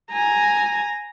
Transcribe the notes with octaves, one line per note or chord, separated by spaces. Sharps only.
G#5 A#5